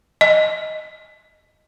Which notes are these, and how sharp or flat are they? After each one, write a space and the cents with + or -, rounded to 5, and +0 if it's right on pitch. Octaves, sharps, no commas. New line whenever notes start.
D#5 -10